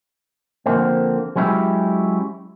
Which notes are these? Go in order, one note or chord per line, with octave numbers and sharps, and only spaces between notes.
D3 F3 A#3 C4
F#3 G#3 C#4 E4 G4